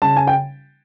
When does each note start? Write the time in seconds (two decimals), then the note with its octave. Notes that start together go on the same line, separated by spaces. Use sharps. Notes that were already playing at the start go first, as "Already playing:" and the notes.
0.02 C#3 A5
0.17 G#5
0.27 G5